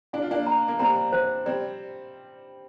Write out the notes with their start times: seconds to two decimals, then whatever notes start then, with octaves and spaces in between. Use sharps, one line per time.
0.13 D4 F5
0.22 F4
0.31 A#3 D4
0.47 A#5
0.68 A#3
0.79 G3 C4 A#5
1.12 C5
1.46 G3 C4 D5